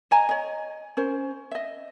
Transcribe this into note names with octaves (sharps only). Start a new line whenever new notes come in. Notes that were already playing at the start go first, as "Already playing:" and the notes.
D#5 G#5 A#5
C#5 D#5
C#4 A#4 C5
D#5 E5